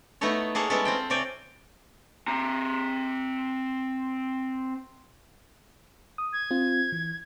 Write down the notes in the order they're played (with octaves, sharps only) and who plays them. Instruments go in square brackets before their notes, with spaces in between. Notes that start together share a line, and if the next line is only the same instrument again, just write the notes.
[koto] A3 B3 D#4 E4 A4 C#5
A#3 G#4 A4 C#5 F#5
G3 G#3 B3 C#4 E4 A4
C4 F4 G5
C3 C#5 D5 G5 G#5
[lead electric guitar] C4 A#5
[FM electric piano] D#6
[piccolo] G#6
[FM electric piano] C4 F4
E3